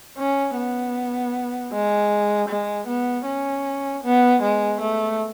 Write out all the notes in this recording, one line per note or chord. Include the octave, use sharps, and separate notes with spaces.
C#4
B3
G#3
G#3
B3
C#4
B3
G#3
A3